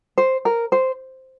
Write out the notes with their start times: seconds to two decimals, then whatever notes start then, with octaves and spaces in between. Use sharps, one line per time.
0.18 C5
0.45 A#4
0.72 C5